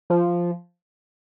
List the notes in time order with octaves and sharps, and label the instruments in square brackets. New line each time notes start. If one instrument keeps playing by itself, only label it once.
[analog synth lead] F3